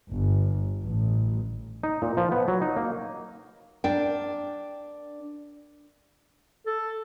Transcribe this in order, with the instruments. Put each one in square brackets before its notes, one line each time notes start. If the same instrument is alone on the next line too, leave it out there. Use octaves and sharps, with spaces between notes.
[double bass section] G1
A1
[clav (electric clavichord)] D#4
A#2
F3
B3
F#3
D#4
A#3
[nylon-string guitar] D4 A#4 G5
[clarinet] A4